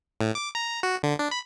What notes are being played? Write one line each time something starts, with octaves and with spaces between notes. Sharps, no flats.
A2
D6
A#5
F#4
D3
D4
B5